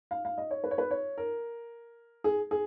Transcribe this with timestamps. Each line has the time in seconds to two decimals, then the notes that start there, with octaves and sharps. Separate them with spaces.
0.11 F5
0.25 F5
0.38 D#5
0.51 C#5
0.64 B4
0.71 C#5
0.78 B4
0.91 C#5
1.18 A#4
2.24 G#4
2.51 G#4